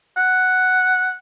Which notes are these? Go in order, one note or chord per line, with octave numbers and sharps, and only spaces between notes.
F#5